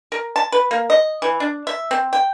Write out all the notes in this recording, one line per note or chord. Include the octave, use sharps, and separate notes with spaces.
A#4
A5
B4
A#3
D#5
E3
D4
E5
C4
G5